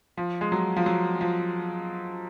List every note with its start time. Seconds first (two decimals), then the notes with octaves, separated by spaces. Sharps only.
0.17 F3
0.41 G#3
0.52 F#3
0.76 F3
0.86 F#3
1.21 F3